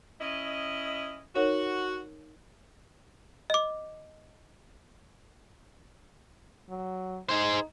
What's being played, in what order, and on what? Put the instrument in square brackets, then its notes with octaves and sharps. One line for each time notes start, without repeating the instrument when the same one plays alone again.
[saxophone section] C#4 E4 D#5
[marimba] D#4 A#4 C#5 [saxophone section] F#4
[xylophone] D#5 D6
[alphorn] F#3
[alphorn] D#4 [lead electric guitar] G#4 C5